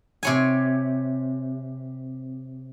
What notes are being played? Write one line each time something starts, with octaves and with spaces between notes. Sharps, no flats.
C3 C#5 G#5